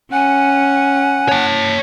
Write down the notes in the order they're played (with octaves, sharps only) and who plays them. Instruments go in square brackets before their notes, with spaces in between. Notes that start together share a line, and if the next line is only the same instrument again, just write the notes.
[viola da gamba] C#4 [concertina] F#5 [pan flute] G#5
[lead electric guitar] C#5 A5